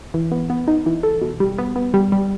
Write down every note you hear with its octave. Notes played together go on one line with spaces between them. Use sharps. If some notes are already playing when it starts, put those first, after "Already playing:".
E3
B3
B3
D#4
E3
A4
B2
G3
B3
B3
G3
G3